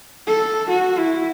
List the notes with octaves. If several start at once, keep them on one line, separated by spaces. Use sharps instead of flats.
A4
F#4
E4